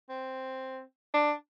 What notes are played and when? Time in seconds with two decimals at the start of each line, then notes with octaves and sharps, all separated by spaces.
0.09 C4
1.14 D4